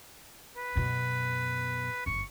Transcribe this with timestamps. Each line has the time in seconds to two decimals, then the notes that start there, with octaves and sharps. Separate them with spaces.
0.57 B4
0.76 F#2 B2
2.06 G1 F#2 C#6